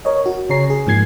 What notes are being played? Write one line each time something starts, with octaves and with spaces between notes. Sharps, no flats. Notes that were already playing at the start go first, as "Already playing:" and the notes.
A#4 C#5 D#5
F#4
C#3 G#4 C#5 A#5 C7
G#4
G#2 F3 A#3 G#6 C7